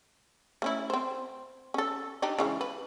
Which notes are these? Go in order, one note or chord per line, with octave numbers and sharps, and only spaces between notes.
A3 C#4 E4
C4 C5
C#4 A4
D4 D#4 G4
C#3 E3 G#3
B4